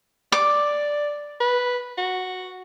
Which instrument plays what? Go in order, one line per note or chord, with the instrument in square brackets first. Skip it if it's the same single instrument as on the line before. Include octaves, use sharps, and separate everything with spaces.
[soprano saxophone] D5 [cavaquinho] D6
[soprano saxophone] B4
F#4